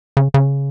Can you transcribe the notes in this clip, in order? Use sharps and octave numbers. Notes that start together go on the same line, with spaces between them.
C#3
C#3